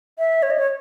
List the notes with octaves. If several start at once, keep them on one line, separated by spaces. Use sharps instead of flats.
E5
C#5
D#5
C#5